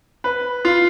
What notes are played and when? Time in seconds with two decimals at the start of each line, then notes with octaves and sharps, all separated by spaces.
0.24 B4
0.65 F4